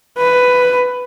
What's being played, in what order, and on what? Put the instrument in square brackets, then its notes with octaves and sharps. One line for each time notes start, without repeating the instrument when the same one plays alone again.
[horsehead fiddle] B4